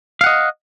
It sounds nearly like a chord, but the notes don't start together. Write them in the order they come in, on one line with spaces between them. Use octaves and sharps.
F5 F#5 D#5